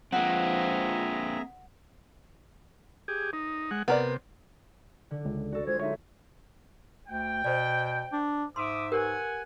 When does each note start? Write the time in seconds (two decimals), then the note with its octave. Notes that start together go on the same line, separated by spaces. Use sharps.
0.12 F3 A#3 C4 G#4 E5 F#5 A#5
3.08 G4 G#4
3.33 D#4
3.71 G#3 F#5
3.88 C3 B3 A#4 D5
5.11 D3
5.25 C#2
5.52 F#4 A4 D5
5.67 G#3 F4 C5 G#6
5.80 G#3 D#4 C#5 E5
7.08 D2 G5
7.44 B2 C5 D5
8.13 D4
8.56 G#2 E5 C6 D6 D#6
8.92 G4 A#4 B4 F#5 G#5